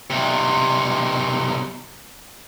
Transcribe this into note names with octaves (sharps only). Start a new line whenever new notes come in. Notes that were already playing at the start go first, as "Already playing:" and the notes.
B1 C3